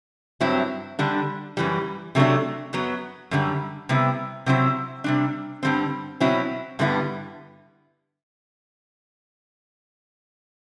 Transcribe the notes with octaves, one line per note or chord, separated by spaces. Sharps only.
G2 F#3 C4 E4
D3 G3 D4
F#2 E3 G3
C3 F#3 A3 D4
F#2 F#3 B3
F#2 D3 G3
C3 G3 B3 E4
C3 F#3 C4 E4
C3 G3 D4
G2 D3 G3 C4
B2 F#3 C4 E4
G2 D3 G3 B3 E4